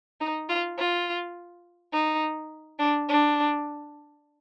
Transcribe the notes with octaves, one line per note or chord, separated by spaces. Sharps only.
D#4
F4
F4
D#4
D4
D4